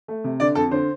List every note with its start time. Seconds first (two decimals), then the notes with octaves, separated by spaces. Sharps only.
0.08 A3
0.24 C3
0.40 D3 D5
0.55 F2 A4
0.71 D3 C5